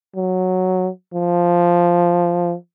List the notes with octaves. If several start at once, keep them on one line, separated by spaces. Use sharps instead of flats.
F#3
F3